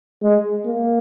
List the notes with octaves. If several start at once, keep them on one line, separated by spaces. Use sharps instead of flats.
G#3
A#3